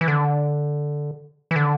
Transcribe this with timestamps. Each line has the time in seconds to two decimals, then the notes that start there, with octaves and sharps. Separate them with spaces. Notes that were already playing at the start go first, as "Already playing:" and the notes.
0.01 E3
0.08 D3
1.51 E3
1.56 D3